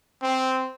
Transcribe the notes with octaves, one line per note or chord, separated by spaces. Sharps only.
C4